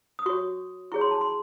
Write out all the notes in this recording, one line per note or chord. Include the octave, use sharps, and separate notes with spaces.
D#6
F#4 C#5 C#6
E4 G#4 C#5 C#6
C6
A5
C6